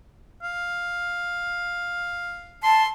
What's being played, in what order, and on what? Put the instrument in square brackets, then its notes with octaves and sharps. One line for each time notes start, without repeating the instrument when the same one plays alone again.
[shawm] F5
[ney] A5 [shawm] C6